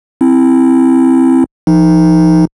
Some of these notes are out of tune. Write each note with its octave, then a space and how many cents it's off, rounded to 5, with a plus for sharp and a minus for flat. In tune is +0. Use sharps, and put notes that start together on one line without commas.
C4 +0 E4 +0
F3 -25 D#4 +0